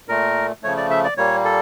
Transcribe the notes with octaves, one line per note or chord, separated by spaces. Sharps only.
A#2 A3 A#4
C#3 F3 A3 C#5
D5
E5
D5
A#2 G3 A#3 C#5
A4